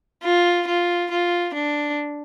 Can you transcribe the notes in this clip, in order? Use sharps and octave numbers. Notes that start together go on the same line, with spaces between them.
F4
F4
F4
D4